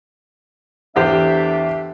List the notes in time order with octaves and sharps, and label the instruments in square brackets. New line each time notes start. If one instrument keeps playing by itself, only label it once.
[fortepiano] E2 G4 C5 [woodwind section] A3 D4 E5